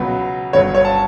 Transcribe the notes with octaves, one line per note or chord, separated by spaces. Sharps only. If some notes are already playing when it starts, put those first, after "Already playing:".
Already playing: C#2 B2 F#3 B3 B4
G1 G2 F#3 C#5
C#5
A5